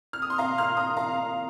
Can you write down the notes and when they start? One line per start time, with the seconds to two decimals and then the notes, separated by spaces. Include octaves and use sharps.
0.13 F6
0.22 D#6
0.30 C6
0.38 F5 A#5
0.58 C6 F6
0.76 A#5 D#6
0.97 F5 A#5